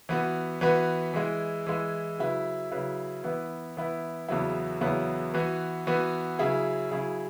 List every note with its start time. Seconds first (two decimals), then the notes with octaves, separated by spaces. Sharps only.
0.09 E3 B3 F#4 B4
0.61 E3 B3 F#4 B4
1.14 E3 G#3 E4
1.67 E3 G#3 E4
2.19 C#3 F#3 E4 B4
2.72 C#3 F#3 E4 B4
3.24 E3 B3 E4 B4
3.77 E3 B3 E4 B4
4.29 E2 C#3 F#3 B3 E4
4.81 E2 C#3 F#3 B3 E4
5.34 E3 B3 F#4
5.87 E3 B3 F#4
6.39 C#3 F#3 E4 G#4
6.91 C#3 F#3 E4 G#4